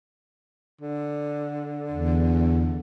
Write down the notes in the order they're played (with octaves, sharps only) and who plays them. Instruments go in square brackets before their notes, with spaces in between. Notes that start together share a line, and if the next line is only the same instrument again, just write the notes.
[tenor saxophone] D3
[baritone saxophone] E2